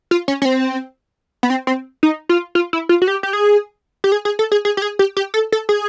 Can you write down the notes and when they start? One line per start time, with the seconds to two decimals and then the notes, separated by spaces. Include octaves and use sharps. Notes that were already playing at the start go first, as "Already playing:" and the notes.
0.11 F4
0.28 C#4
0.42 C#4
0.45 C4
1.43 B3
1.50 C4
1.67 C4
2.03 D#4
2.29 F4
2.55 F4
2.73 E4
2.89 F4
3.02 F#4
3.08 G4
3.23 G4
3.33 G#4
4.04 G4
4.12 G#4
4.25 G#4
4.39 A4
4.52 G#4
4.65 G#4
4.77 G4
4.82 G#4
4.99 G4
5.17 G4
5.34 A4
5.52 A4
5.69 G#4